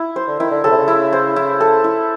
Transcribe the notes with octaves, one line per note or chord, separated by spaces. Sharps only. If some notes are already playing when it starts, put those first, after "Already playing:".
Already playing: E4
C5
D3
D#3 E4
D3
C#3 A4
C3
C#3
E4
C5
E4
A4
E4